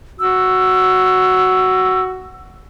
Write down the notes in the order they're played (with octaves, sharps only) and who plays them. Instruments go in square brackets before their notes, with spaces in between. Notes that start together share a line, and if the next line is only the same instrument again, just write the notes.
[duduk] F#4 [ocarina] E6